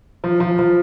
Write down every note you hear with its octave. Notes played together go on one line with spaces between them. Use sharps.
F3
F3
F3